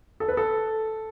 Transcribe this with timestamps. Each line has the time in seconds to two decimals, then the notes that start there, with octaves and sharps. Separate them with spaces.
0.20 A4
0.28 B4
0.37 A4